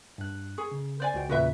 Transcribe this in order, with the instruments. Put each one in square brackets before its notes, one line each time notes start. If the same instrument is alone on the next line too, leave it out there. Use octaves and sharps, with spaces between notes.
[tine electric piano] G2 F#6
[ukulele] G#4 [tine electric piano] C#6
[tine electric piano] C#3
[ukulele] C5 D5 G#5
[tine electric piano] C#2 F#4 G5
[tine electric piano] E2 A#2 C#3 [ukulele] F#4 B4 E5